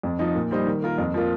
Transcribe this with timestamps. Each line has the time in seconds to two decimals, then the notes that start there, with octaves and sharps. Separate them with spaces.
0.03 F2
0.19 F3 D#4
0.35 A#2
0.51 G3 D#4 C5 D#5
0.67 D#3
0.82 A#3 F4 A#4
0.98 F2
1.14 F3 A#3 F4